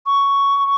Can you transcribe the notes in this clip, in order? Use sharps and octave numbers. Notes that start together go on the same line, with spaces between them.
C#6